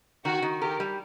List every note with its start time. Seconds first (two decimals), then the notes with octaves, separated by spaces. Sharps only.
0.25 D#3 F#4
0.42 D#3
0.61 G4 A#4
0.80 G3